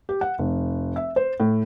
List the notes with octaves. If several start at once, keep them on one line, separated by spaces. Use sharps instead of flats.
G4
F#5
F1
E5
C5
A2